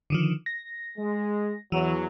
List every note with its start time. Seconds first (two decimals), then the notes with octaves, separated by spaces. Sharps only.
0.10 D3 D#3 F3
0.46 A#6
0.98 G#3
1.72 E2 E3 F#3